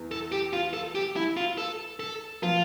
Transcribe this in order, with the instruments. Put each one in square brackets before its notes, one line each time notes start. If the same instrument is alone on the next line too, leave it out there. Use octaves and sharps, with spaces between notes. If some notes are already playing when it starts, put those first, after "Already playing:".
Already playing: [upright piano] E2
[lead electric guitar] A4
G4
F4
A4
G4
E4
F4
A4
A4
[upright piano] F3 [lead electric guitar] F4